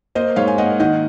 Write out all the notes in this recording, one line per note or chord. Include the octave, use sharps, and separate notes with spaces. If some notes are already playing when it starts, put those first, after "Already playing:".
A#3 C5 D#5
G#2 C#5 F5
G#5
A#3 D#5 F#5
D#3 D#5 F#5